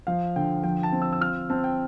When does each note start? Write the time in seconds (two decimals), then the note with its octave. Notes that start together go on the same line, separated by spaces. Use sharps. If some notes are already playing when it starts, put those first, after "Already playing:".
0.07 F3 F5
0.36 D3 G5
0.63 F3 G5
0.83 A5
0.92 C4
1.02 E6
1.12 E6
1.21 F4 F6
1.50 C4 A5
1.64 G5